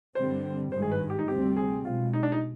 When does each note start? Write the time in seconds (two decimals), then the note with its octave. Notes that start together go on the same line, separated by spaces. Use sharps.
0.15 G2 D3 G3 C4 C5
0.72 G#1 G2 D#3 G#3 C5
0.82 G#4
0.92 B4
1.10 G4
1.19 D#4
1.28 D2 C3 G3 C4 G4
1.57 G#4
1.85 B1 B2 G#3 F4
2.13 D#4
2.23 D4
2.32 D#4